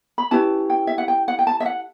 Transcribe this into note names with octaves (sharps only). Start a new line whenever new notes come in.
B5
C#4 E4 G4 B4 A5
G5
E5
F#5
G5
F#5
G5
A5
E5
F#5